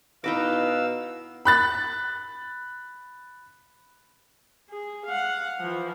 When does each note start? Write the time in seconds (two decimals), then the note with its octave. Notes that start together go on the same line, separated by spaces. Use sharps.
0.24 B2 D#4 E4 B4 F5 D6 E6 A#6
1.45 B5 F#6 A6
4.70 G#4
5.06 F5 F#5
5.60 E3 F3